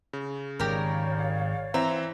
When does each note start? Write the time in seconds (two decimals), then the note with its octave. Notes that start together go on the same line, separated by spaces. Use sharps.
0.13 C#3
0.60 G#1 G#2 D#3 G4 A#4 C#5 D5 F5
1.74 E3 C4 E5 A#5